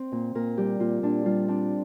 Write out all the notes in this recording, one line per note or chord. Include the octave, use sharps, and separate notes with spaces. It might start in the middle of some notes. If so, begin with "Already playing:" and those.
Already playing: C4 C5
A#2
A#2 A#4
G3 G4
A#2 F4
A#2 D4
G3 F4
C4 D4